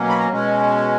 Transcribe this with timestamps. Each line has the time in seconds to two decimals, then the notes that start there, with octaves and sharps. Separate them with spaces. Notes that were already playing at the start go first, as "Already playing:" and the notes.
Already playing: B2 F#3 A#3 C#4
0.09 B5
0.19 A#5
0.30 B2 G#3 C#4